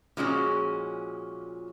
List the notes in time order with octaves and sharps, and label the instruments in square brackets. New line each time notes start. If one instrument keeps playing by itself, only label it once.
[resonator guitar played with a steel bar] A#2 F3 G#3 C#4 F#4